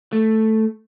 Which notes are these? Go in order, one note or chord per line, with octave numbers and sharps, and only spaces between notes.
A3